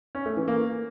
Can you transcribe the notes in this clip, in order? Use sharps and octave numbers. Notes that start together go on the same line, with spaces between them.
C#4
A3
E3
A#3